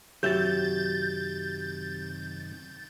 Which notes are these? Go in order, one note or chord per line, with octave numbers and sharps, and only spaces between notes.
F#2 C3 D#3 F#3 G4 E5 G6 A6